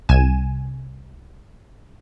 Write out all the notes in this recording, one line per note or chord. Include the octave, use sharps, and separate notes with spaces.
C2 G#5 D#7 E7